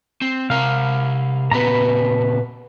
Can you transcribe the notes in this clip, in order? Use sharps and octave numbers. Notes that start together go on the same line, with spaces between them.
C4
C3 A#4 F5
A#2 C#3 B3 B4 A#5